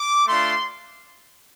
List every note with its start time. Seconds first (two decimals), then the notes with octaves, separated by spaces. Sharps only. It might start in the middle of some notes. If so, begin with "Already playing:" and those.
Already playing: D6
0.27 A3 D4 F4 C6